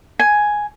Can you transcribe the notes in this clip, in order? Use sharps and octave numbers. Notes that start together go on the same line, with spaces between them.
G#5